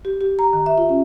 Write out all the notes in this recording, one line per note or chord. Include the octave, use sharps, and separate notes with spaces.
G4
G4
A#5
D#3
E5
F4
C#4